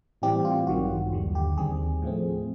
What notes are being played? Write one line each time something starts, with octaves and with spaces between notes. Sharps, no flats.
A2 E3 G3 C4 G4
F4
A1 G2 D#3 F#3 F#4
D#2 D3 G3
G4
D#2 D#3 G3 C4 G#4
A2 F3 A3 C4